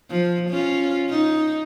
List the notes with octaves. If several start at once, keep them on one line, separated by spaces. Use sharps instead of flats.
F3
C#4 F4
D#4